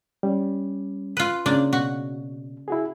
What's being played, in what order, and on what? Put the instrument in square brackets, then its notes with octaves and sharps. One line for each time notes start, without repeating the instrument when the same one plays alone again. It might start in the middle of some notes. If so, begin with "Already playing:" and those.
[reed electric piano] G3 C#4
[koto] F4 B4
C#3 A#3 D4
[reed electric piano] B2 [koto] F#4
[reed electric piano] E4 F#4 G#4